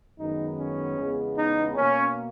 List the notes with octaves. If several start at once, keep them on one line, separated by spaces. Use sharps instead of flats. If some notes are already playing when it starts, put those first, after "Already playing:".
F#2 D#3 G#3 B3 D#4
C#4
E2 C#3 G#3 B3
D#4
B2 A#3 C#4